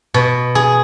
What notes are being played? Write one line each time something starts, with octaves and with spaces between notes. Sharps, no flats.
B2
G#4